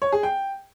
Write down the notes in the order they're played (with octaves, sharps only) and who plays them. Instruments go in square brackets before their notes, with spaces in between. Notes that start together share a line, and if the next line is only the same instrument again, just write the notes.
[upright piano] C#5
G#4
G5